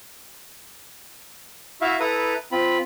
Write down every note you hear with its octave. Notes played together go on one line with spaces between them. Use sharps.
E4 F#4 E5 F5
E4 A4 B4 A#5 D#6
C4 F4 B5